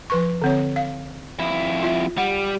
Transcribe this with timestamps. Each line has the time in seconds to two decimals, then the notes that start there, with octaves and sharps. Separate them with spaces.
0.10 F3 B4 C#6
0.42 D3 C4 C#5
0.76 F5
1.39 F2 E4
1.83 F4 E5
2.18 G3 F#5